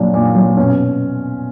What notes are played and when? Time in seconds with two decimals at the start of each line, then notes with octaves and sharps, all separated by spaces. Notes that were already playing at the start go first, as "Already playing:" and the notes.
Already playing: A#2 F#3 D4
0.14 A#2
0.35 F#3
0.57 B2 C#4